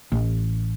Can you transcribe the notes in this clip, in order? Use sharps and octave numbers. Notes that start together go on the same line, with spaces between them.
A1